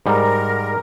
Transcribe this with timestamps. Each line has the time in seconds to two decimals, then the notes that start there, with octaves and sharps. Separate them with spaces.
0.06 G#2 G3 A#4